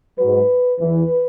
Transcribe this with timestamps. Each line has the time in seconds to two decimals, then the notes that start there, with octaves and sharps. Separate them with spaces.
0.19 G#2 F#3 B4
0.80 E2 E3 B4